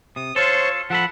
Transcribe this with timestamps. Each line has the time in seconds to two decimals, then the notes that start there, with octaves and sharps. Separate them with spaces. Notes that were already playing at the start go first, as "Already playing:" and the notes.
0.16 C3 D#6
0.36 F4 A4 C5 C#5 C#6
0.90 F3 A4 F#5 B5